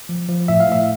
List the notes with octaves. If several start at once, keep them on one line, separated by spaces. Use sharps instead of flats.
F3
F3
A2 E5
F5
A2 E5